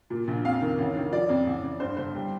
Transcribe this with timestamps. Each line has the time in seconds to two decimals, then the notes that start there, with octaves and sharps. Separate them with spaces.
0.10 A#2
0.28 A#1
0.45 F2 F5
0.61 D#3
0.78 A1
0.96 D#3
1.12 F3 D5
1.29 F2
1.46 A1
1.63 A1
1.80 G2 C5
1.97 G1 C5
2.15 G3